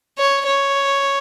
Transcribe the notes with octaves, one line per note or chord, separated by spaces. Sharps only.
C#5
C#5